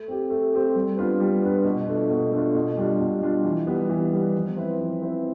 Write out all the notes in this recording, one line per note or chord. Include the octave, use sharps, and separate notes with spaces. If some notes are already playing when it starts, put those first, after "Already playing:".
Already playing: A3
C4 G4
A3
C4 G4
G3
B3 D4 F4 B4
G3
B3 D4 F4 B4
B2
A3 D4 F4
B2
A3 D4 F4
B2
G3 D4 F4
B2
G3 D4 F4
E3
G3 B3
E3
G3 B3
F3
C4 E4 B4
F3
C4 E4 B4